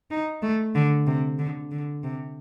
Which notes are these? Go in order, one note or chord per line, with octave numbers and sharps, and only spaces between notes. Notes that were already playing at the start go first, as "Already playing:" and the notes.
D#4
A3
D3
C3
D3
D3
C3